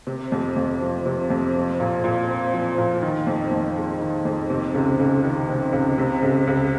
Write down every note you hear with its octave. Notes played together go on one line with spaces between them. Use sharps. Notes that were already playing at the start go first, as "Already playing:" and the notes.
C3
F2
F2
F3
C3
F2
F3
A#2
A#2
C4
F3
A#2
D#3
F2
F2
G#3
D#3
F2
C3
C#2
C#2
D#3
C3
C#2
C3
C#2
C#2